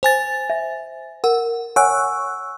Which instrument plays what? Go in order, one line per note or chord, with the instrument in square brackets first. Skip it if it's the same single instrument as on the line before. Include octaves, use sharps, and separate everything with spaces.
[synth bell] C5 G#5 A6
[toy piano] E5
[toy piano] A#4 [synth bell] F#5
[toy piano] C#5 F#5 G#5 [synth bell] C#6 E6 F#6